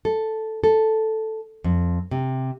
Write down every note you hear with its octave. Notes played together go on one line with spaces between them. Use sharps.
A4
A4
F2
C3